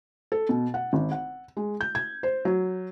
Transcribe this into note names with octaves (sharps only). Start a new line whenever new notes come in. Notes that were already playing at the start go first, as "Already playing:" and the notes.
A4
B2
F#5
G#1
F#5
G#3
G6
G#6
C5
F#3